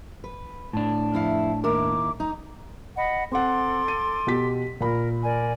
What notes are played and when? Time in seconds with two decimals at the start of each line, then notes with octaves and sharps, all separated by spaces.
0.24 B4
0.73 A2 D4 A5
1.14 F2 E4 F5
1.64 D#2 E4 A#4 D6
2.20 D#4 A#5
2.96 D#5 F#5 B5
3.32 C4 A4 F#5 C6 D6
3.88 D#7
4.27 B2 G4 B6
4.81 A#2 A#4 B5
5.24 A#4 D5 G#5